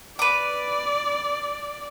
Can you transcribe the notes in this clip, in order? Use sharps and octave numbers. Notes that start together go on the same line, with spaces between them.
B4 D5 D6